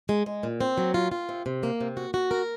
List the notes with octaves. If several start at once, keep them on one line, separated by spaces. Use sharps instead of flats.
G#3
G#3
A#2
C4
F#3
F4
F4
C3
C3
A#3
C3
F#4
F#4
A#4